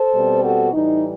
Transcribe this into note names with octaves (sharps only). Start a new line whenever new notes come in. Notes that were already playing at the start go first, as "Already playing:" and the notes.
Already playing: A4 C5
B2 G3 C4
F#4 A4
A2 E3 G3 D#4